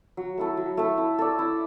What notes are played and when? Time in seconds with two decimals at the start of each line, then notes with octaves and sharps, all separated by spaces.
0.17 F#3
0.38 A3 E4 A4
0.57 F#3
0.77 A3 E4 A4
0.98 E4
1.19 A4 D5
1.39 E4